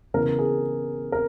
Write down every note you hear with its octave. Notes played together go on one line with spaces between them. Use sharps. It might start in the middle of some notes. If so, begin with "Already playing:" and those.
C#3 E3 B3 A#4
G#4
A#4